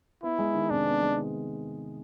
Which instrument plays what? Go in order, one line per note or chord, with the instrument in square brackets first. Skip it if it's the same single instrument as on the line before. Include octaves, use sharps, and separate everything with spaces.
[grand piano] B3 [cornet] E4
[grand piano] G#3
D#3
[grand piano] C3 [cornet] D4
[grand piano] B3
G#3
D#3